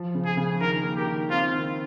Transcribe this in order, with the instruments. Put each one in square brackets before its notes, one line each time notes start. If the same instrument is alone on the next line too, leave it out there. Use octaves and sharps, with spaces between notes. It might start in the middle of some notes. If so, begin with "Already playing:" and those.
Already playing: [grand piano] F3
C#3
[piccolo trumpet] G#4
[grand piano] C#3
[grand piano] D#3 [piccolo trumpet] A#4
[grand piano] A#3
[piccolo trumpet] G4
[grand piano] D#3
[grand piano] C4 [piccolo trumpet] F4
[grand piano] D#3